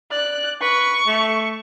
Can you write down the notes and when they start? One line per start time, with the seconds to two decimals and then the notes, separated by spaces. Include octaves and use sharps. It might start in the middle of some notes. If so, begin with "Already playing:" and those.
0.11 D5 F#6
0.62 B4 C#6
1.07 A3